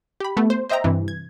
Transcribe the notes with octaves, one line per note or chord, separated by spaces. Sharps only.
G4 B5
A3 B3
C5
C5 D#5 E5 G5 A#5
G2 C3 E3
G#6